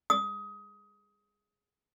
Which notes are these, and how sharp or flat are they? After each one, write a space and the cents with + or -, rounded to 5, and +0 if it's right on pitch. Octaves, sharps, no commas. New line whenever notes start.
D#6 +20